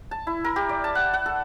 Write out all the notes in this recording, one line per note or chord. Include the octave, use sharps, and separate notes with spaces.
A5
E4
A#4
G4
D5
A5
F#5
F#5
A4